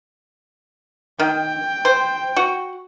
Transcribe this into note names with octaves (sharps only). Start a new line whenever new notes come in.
D#3 G5
C5
F#4